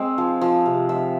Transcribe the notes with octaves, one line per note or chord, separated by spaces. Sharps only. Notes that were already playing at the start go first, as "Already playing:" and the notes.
Already playing: G#3 C4
F3
F3
C3
F3 E5